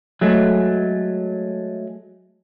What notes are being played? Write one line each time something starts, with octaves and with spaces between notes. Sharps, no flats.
F#3 G#3 A3